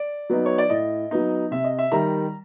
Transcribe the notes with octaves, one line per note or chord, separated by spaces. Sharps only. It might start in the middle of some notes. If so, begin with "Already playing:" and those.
Already playing: D5
F#3 B3 D#4
C#5
D5
A2 D#5
F#3 B3 D#4
C3 E5
D#5
E5
D#3 G3 A#5